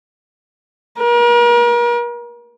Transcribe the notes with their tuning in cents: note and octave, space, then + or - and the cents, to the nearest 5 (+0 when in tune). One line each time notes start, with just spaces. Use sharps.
A#4 +40